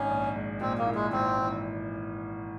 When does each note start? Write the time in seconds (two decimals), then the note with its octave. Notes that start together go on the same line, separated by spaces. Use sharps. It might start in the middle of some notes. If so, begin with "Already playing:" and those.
Already playing: G#1 C#4
0.09 A#1
0.36 G#3
0.61 A#2 C4
0.78 A#3
0.86 E4
0.95 G#3
1.12 G#1 C4
1.38 E3